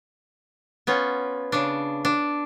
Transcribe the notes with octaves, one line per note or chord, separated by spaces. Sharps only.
B3 C#4 F4
C#3 D4
D4